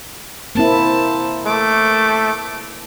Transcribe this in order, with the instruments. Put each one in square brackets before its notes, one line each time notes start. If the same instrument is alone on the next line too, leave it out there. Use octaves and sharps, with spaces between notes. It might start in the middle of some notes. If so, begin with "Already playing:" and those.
[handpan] A#3 C4 E4 [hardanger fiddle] A5
[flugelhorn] A3 [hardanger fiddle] D6